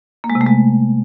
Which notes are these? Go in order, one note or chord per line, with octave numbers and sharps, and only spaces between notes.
A#3
G#3
C3
A3
G#3